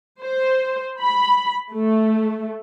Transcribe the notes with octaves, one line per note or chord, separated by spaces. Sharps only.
C5
B5
A3